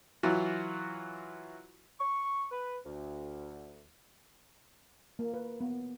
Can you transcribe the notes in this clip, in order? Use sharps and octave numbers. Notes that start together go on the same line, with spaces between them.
E3 F#3 F4 F#4
C#6
B4
D2
A#3
B4
B3